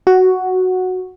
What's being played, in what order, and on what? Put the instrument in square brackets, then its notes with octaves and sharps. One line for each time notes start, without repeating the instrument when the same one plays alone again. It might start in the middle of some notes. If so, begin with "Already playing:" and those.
[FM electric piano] F#4